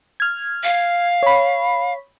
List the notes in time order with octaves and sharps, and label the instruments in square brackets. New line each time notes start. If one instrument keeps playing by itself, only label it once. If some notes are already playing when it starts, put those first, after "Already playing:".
[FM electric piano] F6 G#6
[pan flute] F5
[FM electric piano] C#5 B5